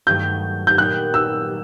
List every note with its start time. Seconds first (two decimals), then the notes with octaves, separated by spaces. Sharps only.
0.07 G2 D#3 F#3 A3 G6
0.67 G6
0.77 A#2 F#3 B3 D#4 G4 F#6
1.14 E6